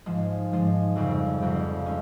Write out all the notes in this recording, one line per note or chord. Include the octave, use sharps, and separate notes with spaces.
G#2 F3 G#3
G#2 F3 G#3
F1 F2 C#3 G3
F1 F2 C#3 G3
G#3 C#4